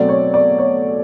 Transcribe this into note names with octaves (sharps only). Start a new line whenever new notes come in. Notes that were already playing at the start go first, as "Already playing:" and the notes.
Already playing: B2 F#3 A3 C4 D5
C#5
D5
C#5